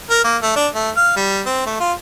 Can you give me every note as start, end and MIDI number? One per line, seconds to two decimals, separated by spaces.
0.10 0.21 70
0.24 0.37 58
0.42 0.52 57
0.56 0.67 62
0.75 0.90 57
0.97 1.16 77
1.17 1.41 55
1.46 1.62 60
1.66 1.80 57
1.80 1.93 65